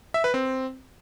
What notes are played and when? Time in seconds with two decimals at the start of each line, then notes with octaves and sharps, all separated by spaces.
0.14 E5
0.24 B4
0.34 C4